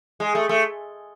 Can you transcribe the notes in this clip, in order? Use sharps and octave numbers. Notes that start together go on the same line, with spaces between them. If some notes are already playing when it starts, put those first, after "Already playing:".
G#3
A3
A3